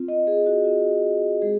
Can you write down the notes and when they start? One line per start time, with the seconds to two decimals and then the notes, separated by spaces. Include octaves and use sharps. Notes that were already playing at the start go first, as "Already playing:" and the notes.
Already playing: C4 F4
0.08 D#5
0.27 G#4
0.46 F#4
0.65 C4 F4
1.42 G#3 G#4